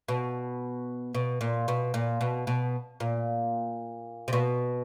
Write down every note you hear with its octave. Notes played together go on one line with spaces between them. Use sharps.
B2
B2
A#2
B2
A#2
B2
B2
A#2
C3
B2